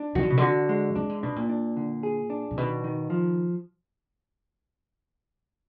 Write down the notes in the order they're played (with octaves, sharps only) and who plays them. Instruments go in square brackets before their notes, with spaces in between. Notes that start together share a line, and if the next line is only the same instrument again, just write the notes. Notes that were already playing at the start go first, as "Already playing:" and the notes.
Already playing: [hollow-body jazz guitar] D4
[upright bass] D#3 [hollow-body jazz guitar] F#4
[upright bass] D3
B2
[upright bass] D3 [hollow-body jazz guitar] F#4
[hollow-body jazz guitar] G#3
[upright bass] D#3 [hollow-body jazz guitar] D4
[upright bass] D3
[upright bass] B2 [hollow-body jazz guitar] D4
[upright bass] A#2
[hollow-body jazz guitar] D4
D3
G#4
D4
[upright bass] A#2
[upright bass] B2 [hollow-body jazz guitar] D#3
[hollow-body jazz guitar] D#3
F3